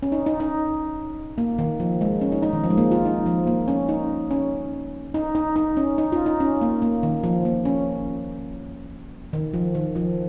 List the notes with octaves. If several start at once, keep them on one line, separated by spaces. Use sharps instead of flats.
C#4
D#4
D#4
D#4
A#3
D#3
F3
G#3
C#4
D#4
D#4
D#3
F3
G#3
A#3
F4
D#4
F3
A#3
C#4
D#4
C#4
D#4
D#4
D#4
C#4
D#4
F4
D#4
C#4
A#3
A#3
D#3
F3
A#3
C#4
D#3
F3
D#3
F3